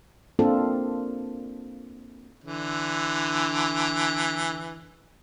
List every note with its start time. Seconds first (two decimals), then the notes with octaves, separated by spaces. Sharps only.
0.39 A#3 C4 D4 F4 A4
2.44 D3 E3